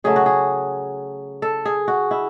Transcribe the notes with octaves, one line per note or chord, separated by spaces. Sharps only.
C#3 F#3 A3 G#4
F#4
G#4
A4
G#4
F#4
E4